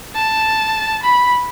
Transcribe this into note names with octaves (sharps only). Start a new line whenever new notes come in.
A5
B5